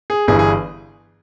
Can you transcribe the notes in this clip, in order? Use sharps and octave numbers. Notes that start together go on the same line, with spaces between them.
G#4
G1 G2 E3 G#4
G#4